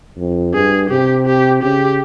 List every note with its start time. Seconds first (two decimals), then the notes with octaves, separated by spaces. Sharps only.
0.17 F2
0.54 G2 G#4
0.90 C3 G4
1.26 G4
1.63 C#3 G4